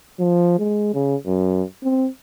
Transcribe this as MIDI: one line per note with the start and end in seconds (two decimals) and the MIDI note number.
0.20 0.59 53
0.59 0.92 56
0.93 1.16 49
1.26 1.63 42
1.83 2.08 60